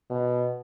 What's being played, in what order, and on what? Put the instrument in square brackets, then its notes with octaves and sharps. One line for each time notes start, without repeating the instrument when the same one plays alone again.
[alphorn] B2